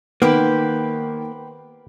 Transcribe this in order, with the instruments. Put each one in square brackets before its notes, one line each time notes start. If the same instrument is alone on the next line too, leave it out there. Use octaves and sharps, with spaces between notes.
[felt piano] D#3 [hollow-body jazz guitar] A#3 [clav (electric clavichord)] B3 [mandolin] G4 B4 C5